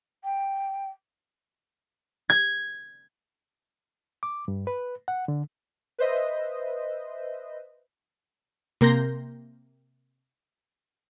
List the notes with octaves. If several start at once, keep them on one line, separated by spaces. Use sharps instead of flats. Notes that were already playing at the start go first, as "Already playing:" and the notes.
G5
G#6
D6
G2
B4
F#5
D3
B4 C5 D#5 E5
C3 A#3 A#4 C6 G6 A#6